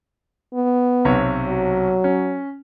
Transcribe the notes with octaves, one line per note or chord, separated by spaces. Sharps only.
B3
B1 C3 C#5
F#3
C#4